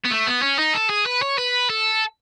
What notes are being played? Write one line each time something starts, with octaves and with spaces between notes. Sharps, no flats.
B3
A3
B3
C#4
D#4
A4
G#4
B4
C#5
B4
A4